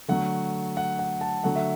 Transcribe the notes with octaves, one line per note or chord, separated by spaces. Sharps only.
D3 F#3 A3 F#5
F#5
F#5
A5
D3 F#3 A3 F#5
E5